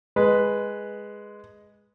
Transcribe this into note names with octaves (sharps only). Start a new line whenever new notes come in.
G#3 B4